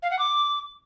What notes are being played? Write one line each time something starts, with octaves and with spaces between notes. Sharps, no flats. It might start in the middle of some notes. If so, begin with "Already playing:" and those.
F5
F#5
D6